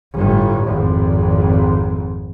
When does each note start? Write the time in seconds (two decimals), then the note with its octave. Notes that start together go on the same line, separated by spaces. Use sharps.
0.13 G1 A2
0.66 G#1 F2